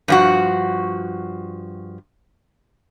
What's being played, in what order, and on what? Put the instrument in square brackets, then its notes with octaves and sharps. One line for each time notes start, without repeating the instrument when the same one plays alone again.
[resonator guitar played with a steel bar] G2 F3 F#4